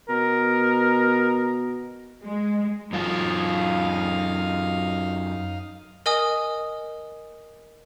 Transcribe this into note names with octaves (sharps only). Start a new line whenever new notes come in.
B2 A#4
G#3
F#2 F#3 D#4 F4 F5
A#4 D#5 G#5 D#6